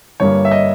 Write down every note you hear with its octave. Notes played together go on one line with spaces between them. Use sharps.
G1 G2 G3 A#3 C#5
E5
D#5